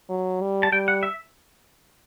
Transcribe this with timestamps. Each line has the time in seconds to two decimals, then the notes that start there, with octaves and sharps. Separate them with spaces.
0.09 F#3
0.41 G3
0.63 A5
0.72 G3 G5
0.88 F#5
1.03 E5